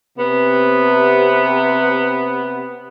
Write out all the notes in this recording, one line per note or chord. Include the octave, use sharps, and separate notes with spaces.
C3 B3